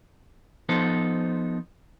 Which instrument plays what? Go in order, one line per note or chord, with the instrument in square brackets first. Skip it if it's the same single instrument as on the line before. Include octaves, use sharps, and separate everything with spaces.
[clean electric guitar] F3 B3 D#4 A4 B4 C5